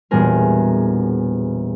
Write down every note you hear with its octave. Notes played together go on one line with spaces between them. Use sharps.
E1 A#2 G3 B3 G#4 A#4